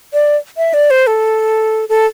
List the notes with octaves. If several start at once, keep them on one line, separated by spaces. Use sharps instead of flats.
D5
E5
D5
C5
A4
A4